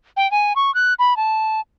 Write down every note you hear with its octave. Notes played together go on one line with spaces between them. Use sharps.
G5
G#5
C#6
F#6
B5
A5